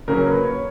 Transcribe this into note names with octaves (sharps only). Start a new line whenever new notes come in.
C#3 F#3 A#3 C#4 A#4
B4
C#5